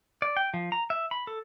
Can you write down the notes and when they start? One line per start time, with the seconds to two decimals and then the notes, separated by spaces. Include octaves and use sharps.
0.22 D5
0.37 G5
0.54 F3
0.72 A#5
0.90 E5
1.11 B5
1.27 A4